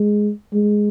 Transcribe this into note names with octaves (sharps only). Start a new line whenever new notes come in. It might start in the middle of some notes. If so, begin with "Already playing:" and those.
Already playing: G#3
G#3